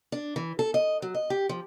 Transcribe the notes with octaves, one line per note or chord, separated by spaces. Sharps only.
D4
E3
A4
D#5
F#3
D#5
G4
F3